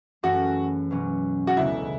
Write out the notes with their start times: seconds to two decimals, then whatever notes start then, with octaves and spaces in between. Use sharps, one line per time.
0.23 F#2 E3 A3 C#4 F#4 G#4
0.91 B1 B2 F#3 C#4
1.47 F#4
1.57 E1 D2 C#3 G#3 B3 E4